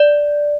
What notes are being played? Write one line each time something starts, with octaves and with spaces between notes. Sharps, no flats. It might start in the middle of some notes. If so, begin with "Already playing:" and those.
Already playing: D5